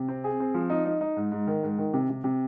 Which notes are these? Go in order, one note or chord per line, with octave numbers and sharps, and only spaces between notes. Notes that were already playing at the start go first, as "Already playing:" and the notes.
Already playing: C3
C4
G#4
C4
F3
D#4
D#4
D#4
G#2
G#2
D#3
G#2
D#3
C3
C3
C3